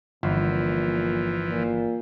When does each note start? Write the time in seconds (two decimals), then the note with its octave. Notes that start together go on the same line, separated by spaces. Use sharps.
0.23 G1 A#2 E3 F3
1.46 A#2